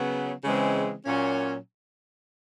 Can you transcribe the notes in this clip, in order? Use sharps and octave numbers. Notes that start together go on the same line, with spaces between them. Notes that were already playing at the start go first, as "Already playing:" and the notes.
Already playing: C#3 F#3 B3
C#3 E3 G#3 C4
A#2 F#3 A#3 C#4